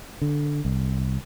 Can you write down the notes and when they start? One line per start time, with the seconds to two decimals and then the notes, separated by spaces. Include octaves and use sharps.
0.22 D3
0.65 C2